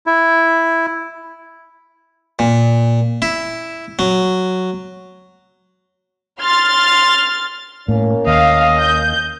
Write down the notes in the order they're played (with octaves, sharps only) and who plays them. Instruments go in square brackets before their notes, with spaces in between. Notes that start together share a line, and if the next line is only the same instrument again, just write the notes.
[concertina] E4
[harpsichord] A#2
E4
F#3
[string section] C6 F6 A6
[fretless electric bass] A2 [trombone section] A#3 C#4
[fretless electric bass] D#2 [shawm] D#5 [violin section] F5
[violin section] G6